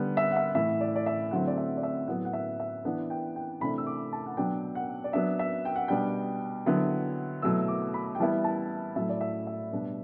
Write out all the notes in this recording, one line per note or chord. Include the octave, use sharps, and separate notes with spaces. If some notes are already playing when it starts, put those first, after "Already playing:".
Already playing: D3 G3 B3
E5
F#5
E5
A2 E3 A3 E4 E5
D5
D5
E5
D3 F#3 A3 C4 E4 F#5
D5
E5
D5
E5
A2 F#3 B3 F#5
F#5
E5
E5
E3 B3 D4 F#5
G5
G5
C3 E3 A3 D4 B5
E6
D6
A5
F#5
B2 F#3 B3 D4 G5
F#5
D5
F#3 B3 D4 E5
E5
G5
F#5
B2 G3 D4 G5
D3 F#3 B3 E4
B2 F#3 A3 E4 E6
D6
B5
G5
E3 G3 B3 E4 A5
A5
A2 F#3 A3 E4 E5
D5
E5
E5
B2 G3 D4